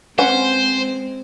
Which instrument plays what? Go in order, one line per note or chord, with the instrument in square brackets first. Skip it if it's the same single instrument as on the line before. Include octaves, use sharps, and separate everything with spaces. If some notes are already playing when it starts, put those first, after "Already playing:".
[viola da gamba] G#3 C4 [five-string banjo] C#4 B4 F#5 [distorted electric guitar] C5